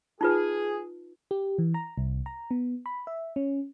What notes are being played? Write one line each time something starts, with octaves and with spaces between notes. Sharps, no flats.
D#4 F4 G#4 B4
G4
E3
A#5
C2
A#5
B3
B5
E5
C#4